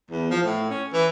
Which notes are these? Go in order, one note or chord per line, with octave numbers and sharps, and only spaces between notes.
E2
F3
A2
C#4
E3